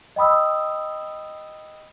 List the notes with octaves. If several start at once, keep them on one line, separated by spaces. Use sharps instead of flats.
D#5 G5 B5 D#6 E6